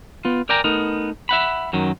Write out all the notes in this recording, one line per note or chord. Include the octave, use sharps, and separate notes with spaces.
B3 F4
A#4 D5 G5 G#5 A#5
A3 B3 D#4 A#4
E5 F#5 B5
F#2 D#3 F#3